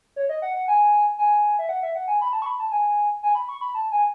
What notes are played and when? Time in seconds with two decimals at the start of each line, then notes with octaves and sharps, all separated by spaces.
0.16 C#5
0.29 D#5
0.42 F#5
0.55 F#5
0.68 G#5
1.18 G#5
1.59 E5
1.69 F#5
1.83 E5
1.95 F#5
2.08 G#5
2.21 B5
2.33 A5
2.42 C#6
2.46 B5
2.59 A5
2.72 G#5
3.23 G#5
3.35 B5
3.49 C#6
3.61 B5
3.75 A5
3.92 G#5